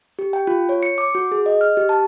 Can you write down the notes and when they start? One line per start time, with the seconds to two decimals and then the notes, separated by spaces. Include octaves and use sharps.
0.19 G4
0.33 G5
0.47 F4
0.69 C#5
0.83 C#7
0.98 D6
1.15 F#4
1.32 G#4
1.46 D#5
1.61 F6
1.77 G4
1.89 A5